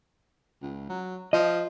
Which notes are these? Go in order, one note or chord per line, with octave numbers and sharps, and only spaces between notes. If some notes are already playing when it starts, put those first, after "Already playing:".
C#2
F#3
F3 D#5